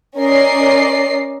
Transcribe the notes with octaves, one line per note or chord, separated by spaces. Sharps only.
C#4 A#4 D5 D#5 C7